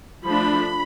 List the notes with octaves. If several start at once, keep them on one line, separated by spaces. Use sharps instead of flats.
F3 A3 D4 B5